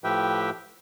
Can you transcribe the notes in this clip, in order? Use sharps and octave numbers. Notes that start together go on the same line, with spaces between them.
A2 F3 G4 B4 E5 G5